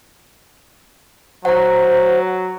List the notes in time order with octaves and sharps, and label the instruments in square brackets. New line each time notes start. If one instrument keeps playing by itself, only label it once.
[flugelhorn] F#3 [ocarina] C5 [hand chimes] F#5 A#5